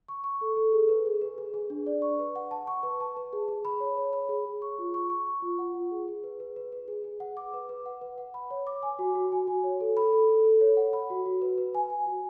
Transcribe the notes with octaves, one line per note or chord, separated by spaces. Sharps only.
C#6
C#6
A4
A4
G#4
B4
G#4
B4
G#4
G#4
D4
D5
C#6
B4
F#5
A5
C#6
B4
A5
B4
G#4
G#4
B5
C#5
C#5
B5
G#4
G#4
C#6
F4
C#6
C#6
C#6
F4
F#5
F4
G#4
G#4
B4
B4
B4
B4
G#4
G#4
F#5
D6
B4
B4
F#5
B4
F#5
B5
C#5
D6
G#5
F#4
F#4
G#5
F#4
C#5
A4
B5
A4
A4
A4
C#5
F#5
B5
F#4
F#4
B4
B4
G#5
G#5
F#4